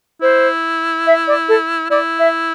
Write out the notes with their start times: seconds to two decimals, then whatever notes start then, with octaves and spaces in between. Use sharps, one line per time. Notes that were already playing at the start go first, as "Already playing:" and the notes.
0.21 E4 C5
1.07 E5
1.27 D5
1.48 A4
1.90 E4 D5
2.19 E5